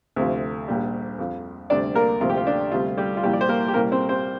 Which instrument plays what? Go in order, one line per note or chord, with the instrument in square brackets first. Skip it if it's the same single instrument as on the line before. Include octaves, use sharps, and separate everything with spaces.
[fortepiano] D2 C3 F3
A#1 A#2 G3
F2 F3
D2 C3 G3 D4 D5
A#3 A#4
D2 C3 F3 F4
G4
F4
D4
D2 C3 G3 F4
G3 G4
F4
C2 A#2 F3 G3 G4
D5
C5
A#3 A#4
G4
C2 A#2 G3 A#3 A#4
C4 C5
C4 C5